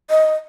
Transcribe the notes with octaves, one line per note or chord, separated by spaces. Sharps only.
D#5